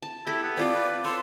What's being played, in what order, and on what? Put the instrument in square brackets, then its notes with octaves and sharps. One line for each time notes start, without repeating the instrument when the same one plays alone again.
[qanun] A5
[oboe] E4 [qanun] G4 A4
[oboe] B3
[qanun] C4 F4 A4 [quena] D5
[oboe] B4
[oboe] A4 [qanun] C#5 [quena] C6